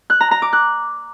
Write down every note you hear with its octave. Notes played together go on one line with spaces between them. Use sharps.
F#6
A#5
A#5
D6
F#6